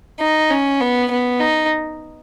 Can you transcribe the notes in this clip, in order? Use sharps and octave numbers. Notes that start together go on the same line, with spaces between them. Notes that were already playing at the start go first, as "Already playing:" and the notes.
D#4
C#4
B3
B3
D#4